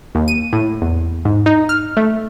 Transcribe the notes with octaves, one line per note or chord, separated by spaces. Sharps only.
D#2
D#7
A2
E2
G#2
D#4
F6
A3